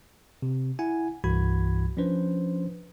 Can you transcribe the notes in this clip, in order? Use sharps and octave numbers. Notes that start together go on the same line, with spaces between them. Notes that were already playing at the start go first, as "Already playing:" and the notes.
C3
E4 F#5 G#5
C2 G2 E3 F#4 B5 G#6
F3 C#4 D4 B4 C5